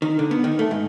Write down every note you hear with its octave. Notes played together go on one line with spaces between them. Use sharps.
D#3
D3
B3
D#3
A3
G#2